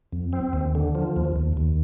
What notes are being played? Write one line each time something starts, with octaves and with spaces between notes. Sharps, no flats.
F2
C4
D#2
D3
F3
D#2
D#2
D#2